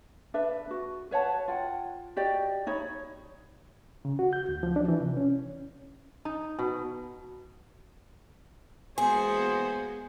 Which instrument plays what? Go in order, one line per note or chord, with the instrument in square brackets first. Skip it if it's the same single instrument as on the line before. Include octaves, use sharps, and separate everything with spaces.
[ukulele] D4 B4 E5
F#4
B4 C#5 F#5 A5
F4 F#5 G5
F#4 G4 D5 D#5
D#4 C#5 B5
[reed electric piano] C#3
F#4
G6
D2
F3
D4
E3
C3
C#4
[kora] D#4
B2
[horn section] E3 A#3 C5 [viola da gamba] G#3 B3 F#4 [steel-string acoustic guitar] G#4 [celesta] G#5